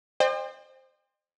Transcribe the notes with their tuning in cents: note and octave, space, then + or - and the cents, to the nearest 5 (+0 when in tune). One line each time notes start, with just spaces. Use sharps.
C5 +5 D#5 -45 G5 +35